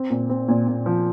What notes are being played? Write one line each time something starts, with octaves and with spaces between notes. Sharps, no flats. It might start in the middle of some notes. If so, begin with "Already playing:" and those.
Already playing: C4
A#2
C4
A#2
A#2
F3